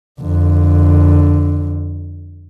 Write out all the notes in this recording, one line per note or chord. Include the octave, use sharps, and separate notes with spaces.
F2 D3